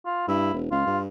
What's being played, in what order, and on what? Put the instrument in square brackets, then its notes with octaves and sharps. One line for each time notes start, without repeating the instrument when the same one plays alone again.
[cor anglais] F4
[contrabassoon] G2 [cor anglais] E4
[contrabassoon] E1
[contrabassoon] C#2 [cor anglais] F4
[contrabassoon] G2